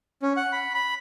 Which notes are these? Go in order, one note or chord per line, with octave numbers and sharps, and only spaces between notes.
C#4
F#5
B5
B5